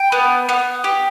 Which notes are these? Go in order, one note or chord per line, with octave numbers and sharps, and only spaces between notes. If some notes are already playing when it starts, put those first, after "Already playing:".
Already playing: G5
B3
B3
G4